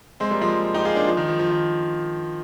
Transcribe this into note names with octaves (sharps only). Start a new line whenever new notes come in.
G#3 C4
G3 A#3
F3 G#3
D#4 G4
F4 G#4
A#3 D4
F3
D#3
F3
F3
D#3